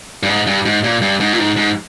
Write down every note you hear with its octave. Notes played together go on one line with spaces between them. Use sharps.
G2
G#2
G2
G#2
A#2
G2
G#2
A#2
G#2
G#2